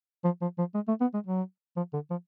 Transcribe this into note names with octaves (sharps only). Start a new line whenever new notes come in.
F3
F3
F3
G#3
A3
B3
G#3
F#3
F3
D3
F3